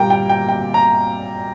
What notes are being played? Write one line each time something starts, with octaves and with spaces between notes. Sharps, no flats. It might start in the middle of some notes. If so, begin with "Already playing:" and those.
Already playing: A#2 G3 A#3 G5 A#5
G5
G5
G5
A#5